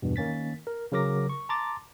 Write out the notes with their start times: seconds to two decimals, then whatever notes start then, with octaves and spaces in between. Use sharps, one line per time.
0.02 E2 G2 B2
0.16 D#3 A#3 C#4 A6 B6
0.67 A#4
0.92 C#3 F#3 A#4 D6 A#6
1.29 C#6
1.49 A5 A#5 C6 D6 A6